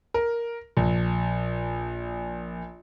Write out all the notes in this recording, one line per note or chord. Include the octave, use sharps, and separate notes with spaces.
A#4
A#1